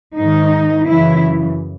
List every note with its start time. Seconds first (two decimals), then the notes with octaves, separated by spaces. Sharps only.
0.16 G#2 D#3 D#4
0.87 F#2 C#3 E3 E4